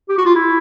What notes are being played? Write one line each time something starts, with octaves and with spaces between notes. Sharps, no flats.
G4
F#4
F4
E4